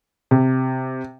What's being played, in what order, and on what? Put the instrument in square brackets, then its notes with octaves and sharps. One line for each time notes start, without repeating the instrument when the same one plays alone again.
[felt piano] C3